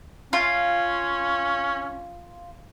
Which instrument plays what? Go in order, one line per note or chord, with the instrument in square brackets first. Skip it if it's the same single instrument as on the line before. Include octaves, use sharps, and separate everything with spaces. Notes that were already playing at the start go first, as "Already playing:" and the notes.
[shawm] C#4 [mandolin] F4